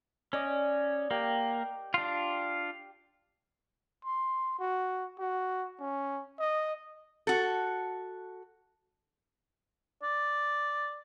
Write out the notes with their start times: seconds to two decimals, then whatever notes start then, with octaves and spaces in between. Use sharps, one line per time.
0.33 C#4 D5 D#5
1.11 A#3 G4
1.94 D4 F4
4.05 C6
4.59 F#4
5.19 F#4
5.80 C#4
6.39 D#5
7.27 F#4 A4
10.03 D5